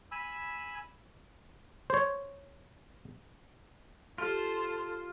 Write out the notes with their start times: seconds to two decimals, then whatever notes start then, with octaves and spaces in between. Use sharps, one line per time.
0.11 G#5 B5 E6
1.90 C5 C#5
4.18 F4 G4 A4 C5 F6 D7